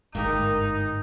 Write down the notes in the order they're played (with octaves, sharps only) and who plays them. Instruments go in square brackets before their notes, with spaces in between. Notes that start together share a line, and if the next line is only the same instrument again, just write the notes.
[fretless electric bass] G1 G#2 [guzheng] A#3 G4 A#4 [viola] D#4